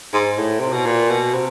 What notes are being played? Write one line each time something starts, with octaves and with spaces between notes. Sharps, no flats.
G#2
A2
C3
B2
A#2
B2
C3